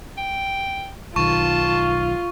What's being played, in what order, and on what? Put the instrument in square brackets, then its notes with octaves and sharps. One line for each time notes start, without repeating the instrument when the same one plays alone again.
[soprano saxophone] G5
[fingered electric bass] B1 D#3 [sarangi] F4 [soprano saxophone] A5 [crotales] C#6